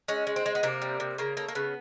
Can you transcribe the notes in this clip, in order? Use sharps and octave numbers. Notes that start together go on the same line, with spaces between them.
G#3 C#4
G#3
C4
G#3
B3
C3 A#3
G3
C3
C#3 A#3
A3 A#3
A#3
C#3 B3